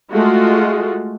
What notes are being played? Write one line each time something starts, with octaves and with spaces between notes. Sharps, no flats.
G#3 A3 F4 F#4